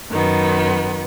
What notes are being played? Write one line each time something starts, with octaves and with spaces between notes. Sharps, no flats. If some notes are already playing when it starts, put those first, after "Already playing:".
F#2 D#3 B3